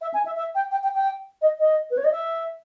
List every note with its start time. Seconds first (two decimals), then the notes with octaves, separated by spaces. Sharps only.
0.01 E5
0.14 G#5
0.25 E5
0.36 E5
0.55 G5
0.71 G5
0.83 G5
0.94 G5
1.42 D#5
1.59 D#5
1.90 B4
1.97 C#5
2.04 D#5
2.11 E5